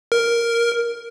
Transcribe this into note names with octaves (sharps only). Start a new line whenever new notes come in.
A#4